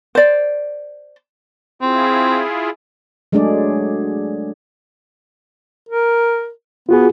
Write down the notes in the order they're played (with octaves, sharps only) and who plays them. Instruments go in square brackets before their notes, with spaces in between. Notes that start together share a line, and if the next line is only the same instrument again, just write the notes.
[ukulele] C5 D5
[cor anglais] C4 [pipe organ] E4 F4 G#4
[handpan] F#3 G#3 A3 D4 G#4 D5
[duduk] A#4
[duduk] B3 [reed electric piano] F4 F#4 G#4